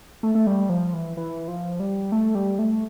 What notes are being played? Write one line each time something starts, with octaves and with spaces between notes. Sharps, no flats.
A3
A3
G3
F3
E3
E3
F3
G3
A3
G3
A3